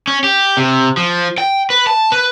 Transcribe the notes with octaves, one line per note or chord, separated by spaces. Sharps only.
C#4
G4
C3
F3
G5
B4
A5
B4